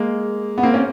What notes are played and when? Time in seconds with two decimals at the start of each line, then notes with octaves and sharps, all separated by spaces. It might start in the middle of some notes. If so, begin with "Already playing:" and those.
Already playing: G#3 A#3
0.58 B3
0.63 A#3 C4
0.74 C#4